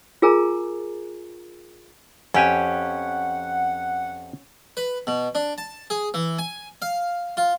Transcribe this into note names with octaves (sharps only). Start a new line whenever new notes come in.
F4 G#4 A#4 G#5 A#5
F2 C#4 G4 F#5 G#5
B4
B2
D4
A5
G#4
E3
G#5
F5
F4